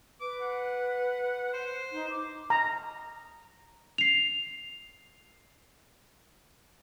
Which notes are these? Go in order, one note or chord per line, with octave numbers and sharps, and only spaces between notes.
B4 D6
F#5
C5
D#4
D6
A#5
C7 F7